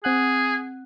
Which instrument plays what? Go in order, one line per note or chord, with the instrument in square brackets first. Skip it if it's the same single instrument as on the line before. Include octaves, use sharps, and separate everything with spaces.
[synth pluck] C4 F#5 F#6 [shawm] G#4